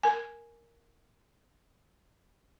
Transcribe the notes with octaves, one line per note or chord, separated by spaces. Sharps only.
A#4 G#5